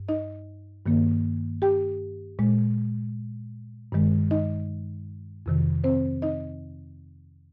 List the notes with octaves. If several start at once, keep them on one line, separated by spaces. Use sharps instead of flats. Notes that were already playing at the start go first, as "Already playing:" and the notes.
Already playing: G2
D#4 D#5
G2 D#3 A#3
G4 G5
A#2 G#3
G2 D#3 G#3
D#4 D#5
F2 C3 D#3
C4 C5
D#4 D#5